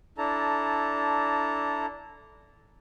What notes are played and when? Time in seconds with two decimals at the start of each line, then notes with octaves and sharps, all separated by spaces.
0.18 D4 E4 A4 A5 A#5